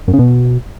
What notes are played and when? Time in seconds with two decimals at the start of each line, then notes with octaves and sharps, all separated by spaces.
0.08 F#2
0.13 C#3
0.19 B2